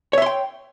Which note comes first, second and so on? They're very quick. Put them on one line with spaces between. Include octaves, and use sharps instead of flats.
C#5 E5 C6 G5